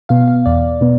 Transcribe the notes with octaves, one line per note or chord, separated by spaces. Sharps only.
B2 B3 F5
F5
E2 D5
B2 B3